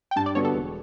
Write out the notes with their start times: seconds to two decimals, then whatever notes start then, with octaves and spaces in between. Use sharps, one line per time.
0.11 G5
0.16 G2 A5
0.26 D5
0.35 D3 G3 B3 F#4 C#5
0.45 A4
0.55 E1